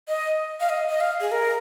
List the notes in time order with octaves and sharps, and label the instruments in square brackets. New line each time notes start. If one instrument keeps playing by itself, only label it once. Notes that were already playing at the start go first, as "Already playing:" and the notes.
[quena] D#5
F5
D#5
D#5
F5
G#4
A#4